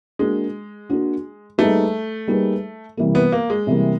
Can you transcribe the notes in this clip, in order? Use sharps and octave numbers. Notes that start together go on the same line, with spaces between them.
G#3 A#3 D4 F#4
A#3 D4 F#4
G3 A3 A#3 D#4 G#4 B4
G3 A#3 D#4 G#4 B4
C3 E3 G3 A#3
B3
A#3
G#3
C3 E3 G3 A#3